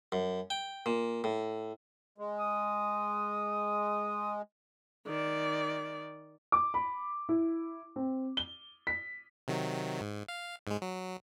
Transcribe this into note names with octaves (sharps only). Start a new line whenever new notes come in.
F#2
G5
A#2
A2
G#3
D#6
D#3 D5
D6
B5
E4
C4
G7
B6
C3 D#3 F#3
G#2
F5
G#2 G#3
F#3